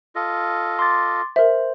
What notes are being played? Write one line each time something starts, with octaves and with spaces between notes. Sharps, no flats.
F4 A4 D#5
C6 D6 A6
A#4 C5 E5